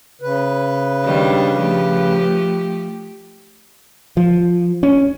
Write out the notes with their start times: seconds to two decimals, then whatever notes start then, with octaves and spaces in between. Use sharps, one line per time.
0.21 C#3 B4
1.04 D#3 G3 D4
1.56 F3 A3 G4
4.17 F3
4.83 C#4